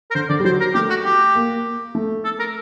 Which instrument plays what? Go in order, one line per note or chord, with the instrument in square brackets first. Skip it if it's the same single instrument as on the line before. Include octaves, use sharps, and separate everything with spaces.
[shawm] A#4
[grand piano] D3 [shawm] C5
[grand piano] D3 [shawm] D5
[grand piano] G3
[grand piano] F#3 [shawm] C5
[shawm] A#4
[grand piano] A3 [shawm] G4
[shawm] F#4
G4
[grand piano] A#3
A3
[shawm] A4
A#4